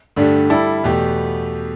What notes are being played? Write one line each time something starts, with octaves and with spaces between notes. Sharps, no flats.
G2 D3 A3 D4 G4
G3 E4 A4 D5
E2 B2 A3 G4